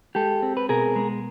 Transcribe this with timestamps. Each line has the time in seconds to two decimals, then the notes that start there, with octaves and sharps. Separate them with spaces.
0.15 G#3 G4 A4
0.42 C4
0.57 B4
0.69 B2 G#4 A#4
0.96 G#3